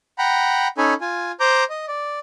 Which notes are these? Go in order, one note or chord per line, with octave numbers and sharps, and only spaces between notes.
F#5 G5 A#5 B5
C#4 D#4 A4 C#5 G#5 B5
F4 G#5
C5 A#5 D6 G6
D#5
D5